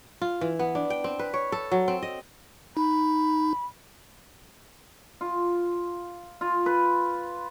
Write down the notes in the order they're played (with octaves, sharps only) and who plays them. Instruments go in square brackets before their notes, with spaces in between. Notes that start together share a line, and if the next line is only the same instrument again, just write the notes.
[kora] F4
E3
B3
D4
G5
C4
B4
C#5
A4
F#3
C4
D#5
[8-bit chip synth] D#4 [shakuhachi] B5
[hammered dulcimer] F4
F4
B4